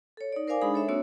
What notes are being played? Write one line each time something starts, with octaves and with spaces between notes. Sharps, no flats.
A4 C#5
D#4 D5
A#4 C5 D5 F5 G#5 D6
G#3 D4 D#4 G#4 B5 D#6
A4 C#5 E5
A#3 C4 D4 F#4 C#5 E6